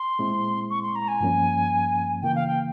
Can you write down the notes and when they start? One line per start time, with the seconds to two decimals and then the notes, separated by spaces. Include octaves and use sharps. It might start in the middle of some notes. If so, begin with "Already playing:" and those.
Already playing: C6
0.19 A#2 G#3 C4 E4
0.70 C#6
0.83 C6
0.95 A#5
1.08 G#5
1.21 G2 F3 A#3 C#4
2.22 C#3 E3 A#3 G5
2.35 F5
2.48 G5